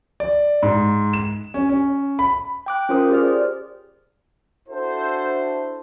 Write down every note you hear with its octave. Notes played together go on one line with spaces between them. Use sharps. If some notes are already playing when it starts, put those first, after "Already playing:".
D5
G#2
E7
C#4
C#4
B5
G5 D6 F#6
C#4 F4 A#4 C5 D#6
G4 G#4 C5 D5 F6
C5 D5
D4 E4 F#4 A4 C5